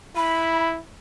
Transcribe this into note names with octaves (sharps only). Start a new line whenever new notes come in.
E4 B5